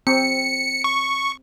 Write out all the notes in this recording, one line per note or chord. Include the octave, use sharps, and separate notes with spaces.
C4 C#7
C#6